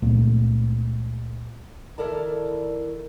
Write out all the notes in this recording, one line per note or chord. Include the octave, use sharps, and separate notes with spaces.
C#2 A#2 A3
D#3 E4 A4 A#4 D5 A5